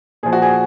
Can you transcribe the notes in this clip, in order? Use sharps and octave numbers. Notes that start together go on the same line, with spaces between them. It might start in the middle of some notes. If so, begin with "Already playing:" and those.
A#2 F3 G#4
F#4
G#4